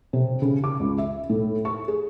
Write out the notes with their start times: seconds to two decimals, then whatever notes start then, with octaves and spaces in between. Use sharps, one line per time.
0.13 C3
0.42 C#3
0.64 D6
0.80 C#2
0.98 E5
1.30 A2
1.65 C#6
1.88 G#4